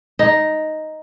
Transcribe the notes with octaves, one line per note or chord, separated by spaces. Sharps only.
D#4